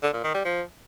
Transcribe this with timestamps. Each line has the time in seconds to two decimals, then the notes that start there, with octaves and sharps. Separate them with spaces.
0.03 D3
0.14 A#2
0.24 D#3
0.34 G3
0.45 F3